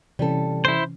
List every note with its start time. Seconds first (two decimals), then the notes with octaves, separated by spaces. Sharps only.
0.19 C3 E3 G3 C#4 A4
0.65 E4 C5